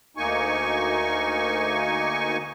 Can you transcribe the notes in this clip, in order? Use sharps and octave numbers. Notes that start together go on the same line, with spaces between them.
D2 A#3 D#4 G#5 C#6